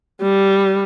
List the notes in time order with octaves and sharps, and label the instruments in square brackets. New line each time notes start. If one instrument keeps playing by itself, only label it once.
[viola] G3